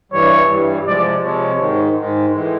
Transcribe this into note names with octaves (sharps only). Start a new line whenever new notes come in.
G2 E3 G3 C#5
G2 E3 G3
C3 F3 G#3 D5
C3 F3 G#3 C#5
G#2 D#3 G#3
G#2 D#3 G#3
A2 E3 G#3